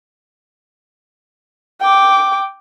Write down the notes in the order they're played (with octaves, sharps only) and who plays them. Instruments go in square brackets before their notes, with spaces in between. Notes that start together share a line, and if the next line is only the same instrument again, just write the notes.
[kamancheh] G5 D6